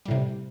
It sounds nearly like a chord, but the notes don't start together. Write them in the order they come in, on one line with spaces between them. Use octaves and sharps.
G3 A2 C3